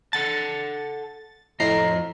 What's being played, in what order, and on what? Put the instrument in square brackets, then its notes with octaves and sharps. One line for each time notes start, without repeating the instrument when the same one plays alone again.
[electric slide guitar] A4 F#5 A5 [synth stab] A6
[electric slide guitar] F2 D#5 [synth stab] A2 A#5 C7